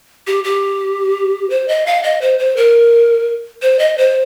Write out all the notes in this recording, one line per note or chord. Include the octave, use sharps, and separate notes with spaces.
G4
G4
C5
D#5
F5
D#5
C5
C5
A#4
C5
D#5
C5